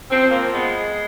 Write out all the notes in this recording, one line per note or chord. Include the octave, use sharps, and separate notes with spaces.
F3 C4
A#3
G#3 B3